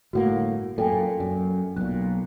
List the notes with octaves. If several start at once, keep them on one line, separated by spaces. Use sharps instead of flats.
G1 A2 A#3 F#4 F#5
F#2 A#2 A4 G5 G#5
F#2
B1 A#2 F#6